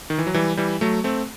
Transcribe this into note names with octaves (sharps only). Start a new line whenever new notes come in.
D#3
E3
F#3
E3 G3
E3 G3
F#3 A3
A3 C4